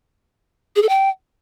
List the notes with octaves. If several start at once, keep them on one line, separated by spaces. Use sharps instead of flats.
G#4
A4
G5